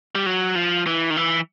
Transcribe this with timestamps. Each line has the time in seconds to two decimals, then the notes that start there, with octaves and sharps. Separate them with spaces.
0.15 G3
0.26 F#3
0.55 F3
0.87 E3
1.10 D#3
1.17 E3